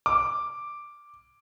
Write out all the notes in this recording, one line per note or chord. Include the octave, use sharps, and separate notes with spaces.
D6